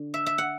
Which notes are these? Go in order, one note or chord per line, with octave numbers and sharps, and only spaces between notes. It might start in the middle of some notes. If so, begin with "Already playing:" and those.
Already playing: D3
E5
E5
F#5